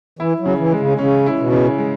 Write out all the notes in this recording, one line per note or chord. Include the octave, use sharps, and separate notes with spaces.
E3 E4
F#3
C#3
E3
G#3
C#3
C#3 C#4
E4
B2
C#3
G#3